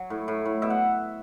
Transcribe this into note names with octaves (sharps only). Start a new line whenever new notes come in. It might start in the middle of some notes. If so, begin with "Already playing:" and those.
Already playing: F#3
A2
A2
A2
B2 E5
F#5